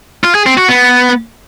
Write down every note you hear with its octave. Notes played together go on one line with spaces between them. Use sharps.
F4
G#4
C4
F#4
B3